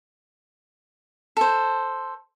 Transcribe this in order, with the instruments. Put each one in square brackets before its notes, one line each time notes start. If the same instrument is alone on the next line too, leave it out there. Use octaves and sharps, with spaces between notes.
[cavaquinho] A4 C5